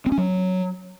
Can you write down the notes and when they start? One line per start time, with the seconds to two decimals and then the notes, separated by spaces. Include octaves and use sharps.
0.06 C4
0.12 C#4
0.18 F#3